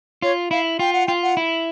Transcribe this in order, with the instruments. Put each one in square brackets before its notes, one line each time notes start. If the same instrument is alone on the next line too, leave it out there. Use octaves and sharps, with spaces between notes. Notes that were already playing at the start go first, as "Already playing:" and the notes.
[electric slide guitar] F4 [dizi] C#5
[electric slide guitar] E4 [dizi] F5
[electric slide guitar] F4 [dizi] G5
[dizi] F#5
[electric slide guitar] F4 [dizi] G5
[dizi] F#5
[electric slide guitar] E4